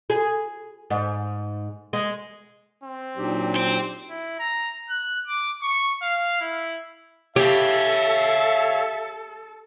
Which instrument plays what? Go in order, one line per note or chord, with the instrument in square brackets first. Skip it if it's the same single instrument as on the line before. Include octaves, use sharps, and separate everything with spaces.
[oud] G#4
G#2
G#3
[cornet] C4
[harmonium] A#2 F#3 G4 [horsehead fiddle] D4 D#4
[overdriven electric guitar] C5 G5
[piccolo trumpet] E4
A#5
F#6
D6
C#6
F5
E4
[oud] G4 [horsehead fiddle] A4 [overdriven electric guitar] C#5 F5 [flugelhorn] E5